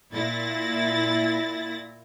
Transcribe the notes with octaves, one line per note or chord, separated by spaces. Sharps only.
A#2 E4 A6 A#6